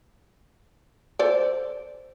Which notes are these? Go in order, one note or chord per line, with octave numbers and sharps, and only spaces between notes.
A4 C5 D5